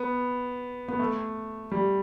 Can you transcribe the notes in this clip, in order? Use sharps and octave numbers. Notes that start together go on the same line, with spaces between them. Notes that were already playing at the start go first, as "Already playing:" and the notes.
Already playing: B3
B3
A3
G3